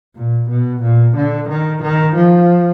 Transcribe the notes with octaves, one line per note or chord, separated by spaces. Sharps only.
A#2
B2
A#2
D3
D#3
D#3
F3